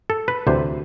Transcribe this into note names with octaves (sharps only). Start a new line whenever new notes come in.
A4
B4
D2 C3 E3 C5